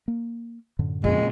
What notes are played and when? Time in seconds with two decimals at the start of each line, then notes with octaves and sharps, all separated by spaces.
0.08 A#3
0.79 F#2 A2 D3
1.04 F2 A#2 C#3 G#3